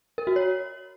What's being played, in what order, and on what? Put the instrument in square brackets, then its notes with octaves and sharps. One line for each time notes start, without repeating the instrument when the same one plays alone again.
[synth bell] A#4
F#4
C#5